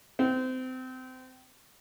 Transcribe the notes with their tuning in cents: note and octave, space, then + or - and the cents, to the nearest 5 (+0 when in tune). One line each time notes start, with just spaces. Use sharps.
C4 -25